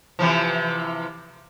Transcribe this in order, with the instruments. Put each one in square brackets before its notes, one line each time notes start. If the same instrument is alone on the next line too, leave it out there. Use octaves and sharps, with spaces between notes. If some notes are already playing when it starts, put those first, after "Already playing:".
[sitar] C3 E3 F3